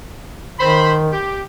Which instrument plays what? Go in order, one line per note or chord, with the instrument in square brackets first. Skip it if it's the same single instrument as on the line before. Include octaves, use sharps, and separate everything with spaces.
[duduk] D#3 [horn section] C5 B5
[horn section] G4